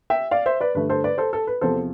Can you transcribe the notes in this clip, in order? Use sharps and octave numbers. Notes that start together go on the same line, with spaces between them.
E5 G5
D5 F5
C5 E5
B4 D5
G2 D3 A3 B4
A4 C5
B4 D5
A4 C5
A4
B4
E2 C3 F3 C4 A4 C5